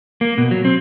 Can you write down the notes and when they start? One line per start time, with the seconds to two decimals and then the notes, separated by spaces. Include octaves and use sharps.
0.21 A#3
0.38 B2
0.51 F#3
0.65 C4